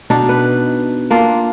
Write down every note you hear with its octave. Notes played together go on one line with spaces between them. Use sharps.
B2 D4 D#4
B4
A#3 D4 F4